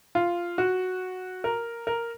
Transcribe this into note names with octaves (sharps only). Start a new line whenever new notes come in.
F4
F#4
A#4
A#4